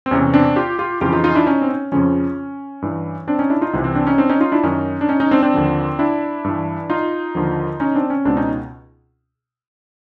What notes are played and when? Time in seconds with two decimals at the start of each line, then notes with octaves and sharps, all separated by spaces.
0.06 C4
0.11 E2 C3 E3 C#4
0.34 C4 D4
0.56 F4 G4
0.79 F4 G4
1.01 F2 C#3 E3 F4 G4
1.13 D#4 F4
1.24 D#4 F4
1.35 D4 E4
1.47 C#4 D#4
1.62 C4
1.69 C#4
1.92 F2 C#3 F3 C#4
2.82 G2 E3
3.27 C4 D4
3.39 C#4 D#4
3.50 D4 E4
3.61 D#4 F4
3.73 C2 C3 E3
3.84 C4
3.95 C4 D4
4.07 C#4 D#4
4.18 C4 D4
4.29 C#4 D#4
4.41 D#4 F4
4.52 D4 E4
4.63 F#2 D#3 C#4 D#4
5.01 D4
5.09 C#4 D#4
5.20 C#4 D#4
5.31 C4 D4
5.43 C4 D4
5.54 D#2 D3 F3
5.99 D4 E4
6.44 G2 E3
6.90 D#4 F4
7.35 D#2 D3 F3
7.80 C#4 D#4
7.95 C4 D4
8.10 C#4
8.25 C#2 B2 C4 D4
8.37 C#4 D#4